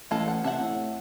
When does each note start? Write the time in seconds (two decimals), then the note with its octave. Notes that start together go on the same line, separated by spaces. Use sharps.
0.11 A1 G#3 F4 A4
0.28 F#5
0.44 C3 A4 E5 F#5
0.59 A2